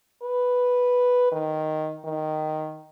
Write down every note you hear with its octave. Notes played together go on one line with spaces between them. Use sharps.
B4
D#3
D#3